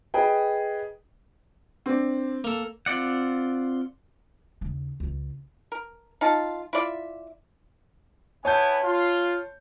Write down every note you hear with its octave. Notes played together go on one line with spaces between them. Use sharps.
G#4 B4 D#5 G5
C4 D4
A#3 A4
C4 F4 D5 F#5
D#2 C#3
C#2 F4
A#4
D#4 F4 A5
E4 F4 D5 E5
B3 E4 C#5 G#5 A5 G6
F4